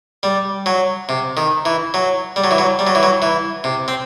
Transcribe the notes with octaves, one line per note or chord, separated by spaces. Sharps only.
G3
F#3
C3
D#3
E3
F#3
G3
F#3
E3
F#3
G3
F#3
E3
F#3
E3
C3
C4